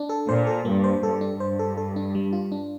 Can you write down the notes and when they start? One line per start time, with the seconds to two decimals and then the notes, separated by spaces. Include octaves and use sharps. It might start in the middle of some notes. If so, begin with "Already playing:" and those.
Already playing: D4
0.09 A4
0.28 A#2 C5
0.47 A4
0.65 G2 A#3
0.84 C5
1.03 G2 A4
1.21 D4
1.40 G2 C5
1.59 A4
1.77 A4
1.96 D4
2.15 G3
2.33 F4
2.52 D4